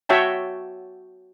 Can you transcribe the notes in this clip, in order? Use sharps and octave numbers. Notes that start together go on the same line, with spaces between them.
F#4 C#5 E5 G5 A5